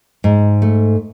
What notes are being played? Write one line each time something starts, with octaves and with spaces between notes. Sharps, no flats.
G#2
A3